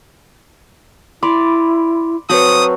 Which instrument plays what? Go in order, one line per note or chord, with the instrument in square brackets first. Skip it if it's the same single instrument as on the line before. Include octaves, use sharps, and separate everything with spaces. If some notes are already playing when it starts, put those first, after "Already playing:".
[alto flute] E4 [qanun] D5 [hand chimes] B5 C6 D6
[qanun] F#3 C4 F#4 [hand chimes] B4 C#5 A5 [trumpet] D#6